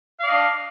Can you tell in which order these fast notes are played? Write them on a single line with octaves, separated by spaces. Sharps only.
F5 D5 D#5 D4